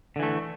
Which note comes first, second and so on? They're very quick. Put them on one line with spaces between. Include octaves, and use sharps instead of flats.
D3 E3 A3